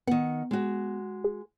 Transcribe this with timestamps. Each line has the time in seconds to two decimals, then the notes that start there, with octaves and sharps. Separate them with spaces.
0.07 D#3 B3 F#5
0.51 G#3 F#4
1.24 G#4